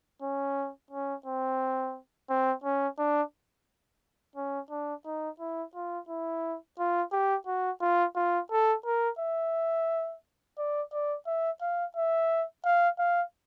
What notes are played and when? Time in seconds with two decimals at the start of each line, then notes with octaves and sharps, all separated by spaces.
0.22 C#4
0.91 C#4
1.26 C4
2.30 C4
2.64 C#4
2.99 D4
4.36 C#4
4.70 D4
5.05 D#4
5.39 E4
5.75 F4
6.09 E4
6.79 F4
7.12 G4
7.47 F#4
7.81 F4
8.16 F4
8.51 A4
8.85 A#4
9.19 E5
10.58 D5
10.92 D5
11.27 E5
11.61 F5
11.96 E5
12.65 F5
12.99 F5